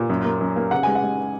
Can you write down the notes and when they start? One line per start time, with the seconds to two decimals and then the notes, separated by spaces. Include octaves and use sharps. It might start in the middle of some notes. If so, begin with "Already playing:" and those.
Already playing: A#2
0.10 F#2
0.25 A#3
0.41 F#2
0.56 A#3
0.71 C#3 F#5
0.83 G#3 G#5
0.95 F#5
1.03 G#3